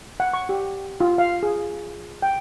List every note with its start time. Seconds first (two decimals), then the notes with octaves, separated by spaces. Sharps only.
0.20 F#5
0.34 C#6
0.49 G4
1.00 F4
1.18 F5
1.43 G#4
2.22 G5